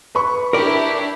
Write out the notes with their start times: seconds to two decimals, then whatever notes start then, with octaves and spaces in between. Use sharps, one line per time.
0.15 B4 B5 C#6
0.53 D4 E4 G4 A#4 D5